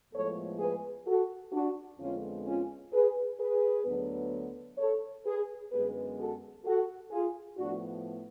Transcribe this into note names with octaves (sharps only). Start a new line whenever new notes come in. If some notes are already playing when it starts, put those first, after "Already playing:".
A2 F3 G#3 B3 A4 C#5
G#4 B4
F#4 A4
D4 F#4
F2 D3 G#3 B3 C#4 F4
C#4 F4
G#4 B4
G#4 B4
D2 D3 F#3 B3
A4 C#5
G#4 B4
F#2 D3 G#3 B3 G#4 B4
F#4 A4
F#4 A4
F4 G#4
A2 F3 B3 D4 F#4